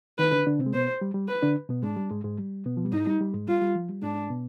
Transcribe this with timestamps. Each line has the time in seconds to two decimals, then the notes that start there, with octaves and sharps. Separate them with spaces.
0.19 D#3 D#4 B4
0.32 D3 D4
0.47 D3 D4
0.59 C3 C4
0.66 G#3
0.73 B2 B3 C5
1.01 G3
1.14 G3
1.28 B4
1.42 D3 D4
1.69 B2 B3
1.83 G#2 G#3 D4
1.96 G3
2.10 G#2 G#3
2.24 G#2 G#3
2.38 G3
2.66 B2 B3
2.77 F3
2.85 G3
2.93 G#2 G#3 D#4
3.07 G3
3.21 G3
3.34 G#2 G#3
3.48 G3 F4
3.62 G3
3.75 F3
3.89 G3
4.02 G#2 G#3 D4
4.30 B2 B3